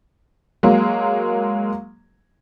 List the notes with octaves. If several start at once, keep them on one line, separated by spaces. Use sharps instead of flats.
F#3 G#3 A#3